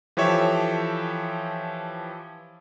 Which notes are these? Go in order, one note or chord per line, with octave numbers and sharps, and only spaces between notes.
E3 F3 G4 A4 C#5 E5